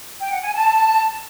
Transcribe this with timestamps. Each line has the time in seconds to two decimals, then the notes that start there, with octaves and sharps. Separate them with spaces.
0.20 G5
0.31 F#5
0.42 G#5
0.54 A5